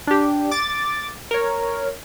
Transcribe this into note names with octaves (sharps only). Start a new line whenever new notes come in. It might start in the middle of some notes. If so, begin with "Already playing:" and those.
D4 G4
D6 A6
A#4 C#5